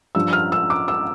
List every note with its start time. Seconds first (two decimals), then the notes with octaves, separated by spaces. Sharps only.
0.15 G2 F3 E6
0.33 F6
0.52 E6
0.70 D6
0.88 E6